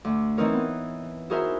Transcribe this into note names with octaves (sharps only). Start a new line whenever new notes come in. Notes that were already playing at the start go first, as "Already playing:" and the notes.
D2
E3 C4 D#4 A#4 C#5
B3
E4 F#4 G#4 A#4 C5 E5